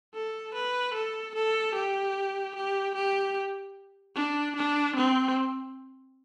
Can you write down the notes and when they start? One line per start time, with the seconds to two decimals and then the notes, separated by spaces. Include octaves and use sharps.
0.15 A4
0.54 B4
0.94 A4
1.35 A4
1.75 G4
2.56 G4
2.95 G4
4.15 D4
4.56 D4
4.96 C4